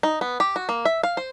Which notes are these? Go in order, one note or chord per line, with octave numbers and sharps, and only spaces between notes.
D#4
B3
G4
F#4
A#3
E5
F5
C5